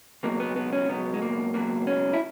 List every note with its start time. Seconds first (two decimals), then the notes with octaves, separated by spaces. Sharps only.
0.23 C#2 B2 F#3 A#3
0.40 B3
0.56 B3
0.72 C#4
0.89 C#2 B2 F#3 B3
1.14 G#3
1.22 A#3
1.54 C#2 B2 F#3 A#3
1.87 C#4
2.13 E4